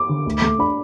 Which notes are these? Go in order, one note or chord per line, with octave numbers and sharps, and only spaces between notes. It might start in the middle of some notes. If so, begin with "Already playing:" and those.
Already playing: D6
D3
D2
A3
D4 B5